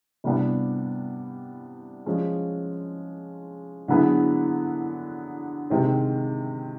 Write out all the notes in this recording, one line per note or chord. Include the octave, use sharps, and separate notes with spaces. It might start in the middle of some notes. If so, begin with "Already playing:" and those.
C3 E3 G3 B3 D4
F3 G#3 C#4
D3 F#3 B3 E4 G#4
C3 D#3 G#3 C4